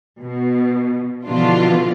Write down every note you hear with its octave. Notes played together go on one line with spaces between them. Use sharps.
B2
B2 D3 E3 F3 D4 F4